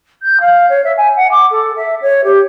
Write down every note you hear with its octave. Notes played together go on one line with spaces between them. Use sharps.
G6
F5
C#5
E5
G#5
F#5
D6
A4
E5
C#5
G4